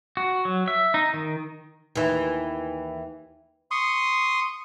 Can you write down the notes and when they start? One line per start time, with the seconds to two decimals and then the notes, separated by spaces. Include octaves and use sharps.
0.17 F#4
0.45 F#3
0.68 E5
0.94 D#4
1.14 D#3
1.95 D#2 E3
3.71 C6 C#6 D#6